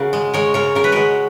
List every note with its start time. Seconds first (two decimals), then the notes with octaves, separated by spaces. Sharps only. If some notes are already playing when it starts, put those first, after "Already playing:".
Already playing: C#3 F#4 A#4
0.13 G#3
0.34 G#3 A#4 C#5
0.54 C#3 A#4 C#5
0.75 C#3 A#4
0.84 B4
0.92 G#3 F#4 A#4